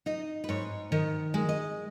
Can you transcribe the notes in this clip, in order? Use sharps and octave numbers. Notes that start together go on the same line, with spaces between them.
D#4 D#5
B4
G#2 C#5
D#3 D#5
G#3
D#5